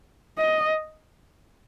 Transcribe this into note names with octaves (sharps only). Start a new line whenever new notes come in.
D#5